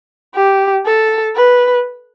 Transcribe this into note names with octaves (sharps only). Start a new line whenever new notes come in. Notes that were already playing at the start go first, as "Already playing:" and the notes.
G4
A4
B4